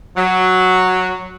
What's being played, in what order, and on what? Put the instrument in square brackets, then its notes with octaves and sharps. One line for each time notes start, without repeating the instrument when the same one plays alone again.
[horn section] F#3